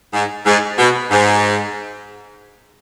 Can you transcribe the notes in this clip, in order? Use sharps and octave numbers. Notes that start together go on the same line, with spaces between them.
G#2
G#2
B2
G#2